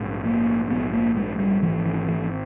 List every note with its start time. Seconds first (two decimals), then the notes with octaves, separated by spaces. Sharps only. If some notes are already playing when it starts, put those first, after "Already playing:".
Already playing: A#1 G#2
0.25 A#3
0.70 A#1 G#2 B3
0.93 A#3
1.17 G#3
1.40 G3
1.62 G#1 G#2 E3
1.86 E3
2.08 E3